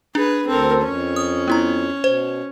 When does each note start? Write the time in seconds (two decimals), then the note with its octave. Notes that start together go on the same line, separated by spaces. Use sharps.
0.15 D4 G#4 B4
0.47 D2 C4 A4 A#4 C5
0.83 F2 C#4
1.16 D#6
1.48 B3 E4 A#5
2.04 B2 C5